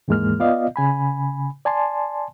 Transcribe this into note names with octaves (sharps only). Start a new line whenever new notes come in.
D#2 G#2 E3 G#3 A#3 F6
B3 F4 D5 D#5 F5
C#3 G#5 B5
D5 G#5 A5 C6